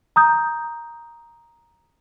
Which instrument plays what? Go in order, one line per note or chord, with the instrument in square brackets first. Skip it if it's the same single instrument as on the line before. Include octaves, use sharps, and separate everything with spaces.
[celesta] A#5 D#6 G6